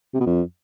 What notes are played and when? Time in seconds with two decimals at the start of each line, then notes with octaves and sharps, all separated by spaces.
0.15 C3
0.21 B2
0.27 F2